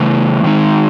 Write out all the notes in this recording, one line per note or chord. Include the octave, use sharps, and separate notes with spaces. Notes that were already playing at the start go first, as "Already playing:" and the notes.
Already playing: C#3 E3 A3
D#3 G#3 D#4